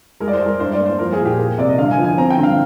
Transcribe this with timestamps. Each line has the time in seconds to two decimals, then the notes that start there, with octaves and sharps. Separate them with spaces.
0.20 G#3 A#4
0.28 D5
0.33 C5
0.40 G#3
0.46 A#4
0.60 G2 C5
0.73 D5
0.79 A#3
0.86 C5
0.98 F3 A#4
1.13 G#4
1.19 A#2
1.25 G4
1.38 A#3
1.58 C3 D5
1.69 D#5
1.78 D3 F5
1.91 G#5
1.98 F3
2.04 G#5
2.18 C4 A#5
2.30 G5
2.38 D3
2.43 F5